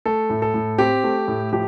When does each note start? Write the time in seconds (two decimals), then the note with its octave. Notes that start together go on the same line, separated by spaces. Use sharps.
0.06 A3 A4
0.30 A2
0.42 A4
0.54 A2
0.78 C4 G4
1.04 A3
1.28 A2
1.53 F3 G4